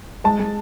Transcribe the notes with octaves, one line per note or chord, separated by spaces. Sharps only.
G#3 A5
G#3